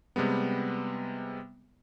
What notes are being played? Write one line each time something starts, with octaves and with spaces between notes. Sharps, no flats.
C3 G3 G#3 B3